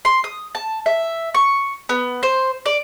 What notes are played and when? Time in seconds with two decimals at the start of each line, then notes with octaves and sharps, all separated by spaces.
0.05 C6
0.24 D#6
0.55 A5
0.86 E5
1.34 C#6
1.89 B3
2.23 C5
2.66 D5